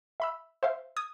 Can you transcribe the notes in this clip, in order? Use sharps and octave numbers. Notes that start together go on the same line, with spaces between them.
E5 B5 E6
C5 E5 F5
D#6 G#6